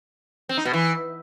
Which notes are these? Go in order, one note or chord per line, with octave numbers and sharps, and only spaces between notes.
C4
D#4
B2
E3